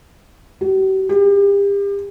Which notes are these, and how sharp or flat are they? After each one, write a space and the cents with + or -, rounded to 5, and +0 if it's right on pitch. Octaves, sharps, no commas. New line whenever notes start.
G4 -45
G4 +35